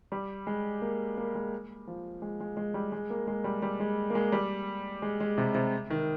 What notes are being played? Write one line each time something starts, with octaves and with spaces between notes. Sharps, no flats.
G3
G#3
A#3
A#3
G#3
F3
G#3
G#3
G#3
G3
G#3
A#3
G#3
G3
G3
G#3
A#3
G#3
G3
G#3
G#3
C3
C3
D#3